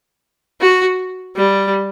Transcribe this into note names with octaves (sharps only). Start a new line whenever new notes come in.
F#4
G3